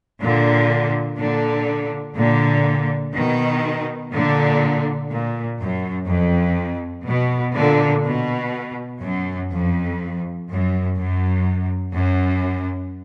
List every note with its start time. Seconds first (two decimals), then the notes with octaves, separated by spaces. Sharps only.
0.21 A#2 D3
1.18 A#2 D3
2.17 A#2 D3
3.14 B2 D#3
4.12 A#2 D3
5.10 A#2
5.59 F#2
6.08 F2
7.07 B2
7.55 A#2 D3
8.05 B2
9.03 F#2
9.52 F2
10.50 F#2
10.98 F#2
11.96 F#2